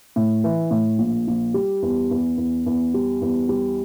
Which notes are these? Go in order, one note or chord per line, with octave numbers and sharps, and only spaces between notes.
A2
E3
A2
A#1
A#1
G3
E2
E2
E2
E2
G3
E2
G3